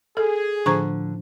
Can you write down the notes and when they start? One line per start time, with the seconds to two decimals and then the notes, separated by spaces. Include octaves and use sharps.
0.17 G#4 A4
0.66 A2 D3 F3 C5 A#5 C#6